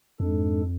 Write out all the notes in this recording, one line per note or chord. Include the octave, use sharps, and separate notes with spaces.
F2 G#2 G#3 D4 A4